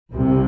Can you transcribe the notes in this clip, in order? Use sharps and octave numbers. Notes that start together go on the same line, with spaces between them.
C2 C3